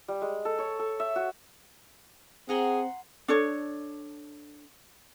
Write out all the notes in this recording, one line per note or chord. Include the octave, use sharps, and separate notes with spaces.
G3
G#3
A4
C#5
A4
E5
F#4
C4 G#4 F#5 A#5 C6
D4 A4 C#5